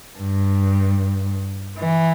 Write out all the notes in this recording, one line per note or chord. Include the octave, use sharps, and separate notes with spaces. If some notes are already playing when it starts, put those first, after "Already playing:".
G2
E3